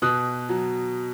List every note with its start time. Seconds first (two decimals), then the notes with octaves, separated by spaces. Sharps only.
0.02 B2 D#6 F#6
0.49 F#3